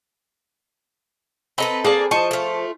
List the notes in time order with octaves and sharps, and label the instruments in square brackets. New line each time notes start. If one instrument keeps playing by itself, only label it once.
[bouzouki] C4 A4 B4 [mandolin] D#5 A#5 B5
[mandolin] A#3 D5 A5 [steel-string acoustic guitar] G#4
[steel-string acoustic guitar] F3 [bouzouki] C5 D#5 [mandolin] A5 C#6
[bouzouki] A3 F4